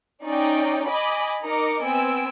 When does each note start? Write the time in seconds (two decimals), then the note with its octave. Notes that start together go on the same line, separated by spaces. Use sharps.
0.23 C#4 D#4 D5 G5
0.87 D#5 G#5 B5 D6
1.42 D#4 A#4 D#5 A#5 D6 C#7
1.83 B3 C4 G#5 E6 D7